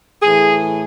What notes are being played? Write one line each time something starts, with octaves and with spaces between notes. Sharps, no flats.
A2 E3 G#4